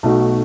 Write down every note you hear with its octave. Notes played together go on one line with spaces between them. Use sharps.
B1 B2 A3 D#4 F#4